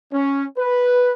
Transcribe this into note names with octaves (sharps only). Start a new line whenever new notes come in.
C#4
B4